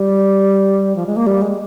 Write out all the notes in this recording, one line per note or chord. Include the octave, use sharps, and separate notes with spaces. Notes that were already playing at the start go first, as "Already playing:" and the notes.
Already playing: G3
F3
G#3
A#3
G3
G#3